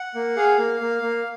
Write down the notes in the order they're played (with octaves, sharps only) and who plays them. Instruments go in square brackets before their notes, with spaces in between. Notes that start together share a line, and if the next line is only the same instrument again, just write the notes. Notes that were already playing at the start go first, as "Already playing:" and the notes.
Already playing: [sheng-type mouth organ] F#5
A#3
G#4 F5
A#3
A#3
A#3